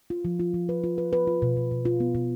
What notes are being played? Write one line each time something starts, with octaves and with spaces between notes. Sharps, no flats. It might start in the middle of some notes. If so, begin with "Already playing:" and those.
F4
F3
F4
F3
B4
F4
B4
B4
F4
B2
B2
B2
F4
B3
B2